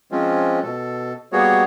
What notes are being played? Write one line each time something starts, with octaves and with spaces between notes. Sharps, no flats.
F3 G#3 C4 C#4 F4
B2 A4
G3 A#3 B3 F#4 G#4 C#5